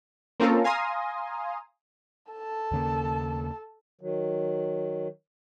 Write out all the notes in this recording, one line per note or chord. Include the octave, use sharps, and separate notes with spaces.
A#3 C4 C#4 F4 A4 A#4
F5 G#5 A#5 C6 D#6
A4 A5
D#2 C#3 A#3
D#3 F#3